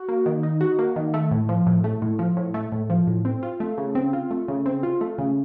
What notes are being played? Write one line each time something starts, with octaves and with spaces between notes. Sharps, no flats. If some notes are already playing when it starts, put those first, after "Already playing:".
Already playing: F#4
A#3
D#3
D#4
F#4
A#3
D#3
A3
A2
F3
A2
A3
A2
F3
A2
A3
A2
F3
A2
C4
F4
A3
C#3
C4
F4
A3
C#3
C4
F4
A3
C#3